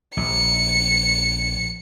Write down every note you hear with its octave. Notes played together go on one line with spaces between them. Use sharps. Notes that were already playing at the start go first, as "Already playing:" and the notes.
A#1 C#7